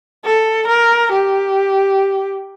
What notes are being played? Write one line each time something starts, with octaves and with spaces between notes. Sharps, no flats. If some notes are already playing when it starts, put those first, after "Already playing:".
A4
A#4
G4